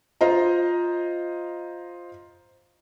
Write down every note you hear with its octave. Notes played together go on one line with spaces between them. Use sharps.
F4 C5 D#5 A#5